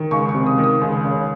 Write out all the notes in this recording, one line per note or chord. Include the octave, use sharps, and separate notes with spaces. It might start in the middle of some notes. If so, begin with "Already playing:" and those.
Already playing: D#3
C#2 C#6
C#6
C3
D#6
D#3
D#6
C#2
C#3